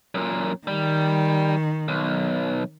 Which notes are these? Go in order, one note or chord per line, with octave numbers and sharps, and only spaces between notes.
F#2 A#2
D#3 G3
B1